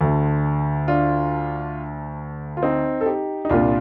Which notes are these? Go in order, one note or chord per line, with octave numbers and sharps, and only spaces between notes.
D2 D3
D4 F4
F4
C4 D#4
A4
D#4 G4
D#4
C2 A#2 D4 F4